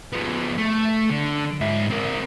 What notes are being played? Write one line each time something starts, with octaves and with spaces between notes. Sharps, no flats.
F3 B3
A3
D3
G#2 E5
C4 A#4